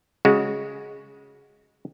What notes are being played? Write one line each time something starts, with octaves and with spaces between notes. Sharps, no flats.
C#3 G#3 F#4